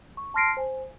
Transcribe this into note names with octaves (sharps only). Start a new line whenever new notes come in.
C#6
A5 C6 F6 A#6 C7 D7
C5 G#5